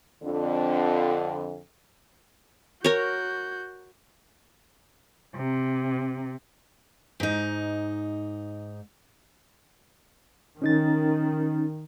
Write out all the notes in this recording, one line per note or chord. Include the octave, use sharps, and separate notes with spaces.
F2 D3
F#4 A#4 C#5 G6
C3
G#2 D#4
D#3 C#4 D#4 A6